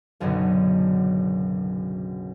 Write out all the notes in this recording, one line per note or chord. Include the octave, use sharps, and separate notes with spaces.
F#1 B1 F#2 B2 D3 F#3